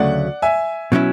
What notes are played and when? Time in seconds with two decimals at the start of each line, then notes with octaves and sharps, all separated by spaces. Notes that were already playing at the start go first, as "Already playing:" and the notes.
Already playing: D2 C#3 F#3 A3 D5 F#5
0.42 E5 G#5
0.92 B2 F#3 C#4 E4